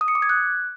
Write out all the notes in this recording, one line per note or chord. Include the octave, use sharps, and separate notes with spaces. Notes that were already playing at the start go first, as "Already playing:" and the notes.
D#6
C#7
D6
G#6
F#6